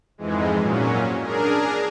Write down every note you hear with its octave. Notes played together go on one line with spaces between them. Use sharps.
F2 G#2 E3 G#3
A#2 F#3 C#4
D4 G#4 A#4